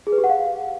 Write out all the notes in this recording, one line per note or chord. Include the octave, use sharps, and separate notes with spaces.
G#4
B4
G4
F#5
F5